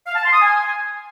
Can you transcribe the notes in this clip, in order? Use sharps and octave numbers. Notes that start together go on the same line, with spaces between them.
F5
A5
C6
D#6
G#5